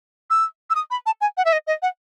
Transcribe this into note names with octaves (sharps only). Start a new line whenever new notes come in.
E6
E6
D#6
B5
A5
G#5
F#5
E5
D#5
D#5
F#5